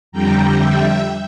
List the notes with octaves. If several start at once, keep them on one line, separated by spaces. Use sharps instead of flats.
F2 D3 G3 G5 A#5
E5 G5